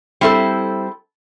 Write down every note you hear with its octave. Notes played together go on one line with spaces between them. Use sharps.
G3 C4 E4 A4